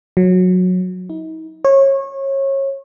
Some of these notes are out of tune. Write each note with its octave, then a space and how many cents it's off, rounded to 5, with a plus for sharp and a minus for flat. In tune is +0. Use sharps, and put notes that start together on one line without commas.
F#3 -20
D#4 +40
C#5 -25